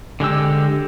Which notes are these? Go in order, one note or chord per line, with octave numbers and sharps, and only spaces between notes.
D3 G#3 G4 E6